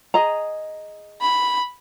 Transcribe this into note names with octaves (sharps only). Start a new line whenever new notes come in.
G#4 D#5 A#5
B5